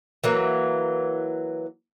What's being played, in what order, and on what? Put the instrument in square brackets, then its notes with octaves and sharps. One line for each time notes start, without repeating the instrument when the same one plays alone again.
[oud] E3 F#3 A#3